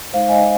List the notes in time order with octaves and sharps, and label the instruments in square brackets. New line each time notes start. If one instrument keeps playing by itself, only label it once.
[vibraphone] G#3 D#4 C5 F5
D#5 G#5